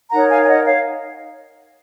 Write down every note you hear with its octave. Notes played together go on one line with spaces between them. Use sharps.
D#4 A#4 C#5 F#5 A#5
F5 G#5
G#5
D#5 F#5
C#5 F5